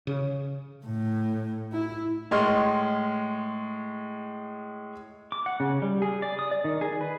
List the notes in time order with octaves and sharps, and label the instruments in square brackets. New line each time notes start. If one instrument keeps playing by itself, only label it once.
[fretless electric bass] C#3
[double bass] A2
E4
[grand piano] A2 G#3 C6 F6
[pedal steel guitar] D6
F#5
C#3
G3
G#4
D5
D#6
D5
D#3
G#4
B4